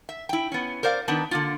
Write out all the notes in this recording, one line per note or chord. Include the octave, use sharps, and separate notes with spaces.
E5
E4 G5
B3 C#4
A#4 C5 D5 F5
D#3 B3 D4 D#4 B4 A5
D3 A#3 F4